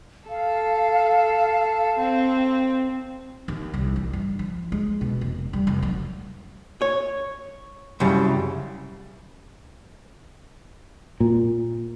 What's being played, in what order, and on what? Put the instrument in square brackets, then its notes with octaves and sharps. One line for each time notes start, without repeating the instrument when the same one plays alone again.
[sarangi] A4 [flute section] F5
[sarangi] C4
[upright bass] D#2
C2
A1
G2
F3
G#3
B2
F1
G3
F1
F#3
[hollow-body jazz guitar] C#5
C2 F#2 C#3 G3
[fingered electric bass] A#2